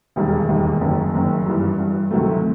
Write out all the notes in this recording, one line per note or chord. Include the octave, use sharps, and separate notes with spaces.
E1 D#2 D#3 G3
E1 D#2 D#3 G3
F#1 F#2 D#3
F#1 F#2 D#3
G2 E3 G3
G2 E3 G3
D2 C3 D#3 F#3 A3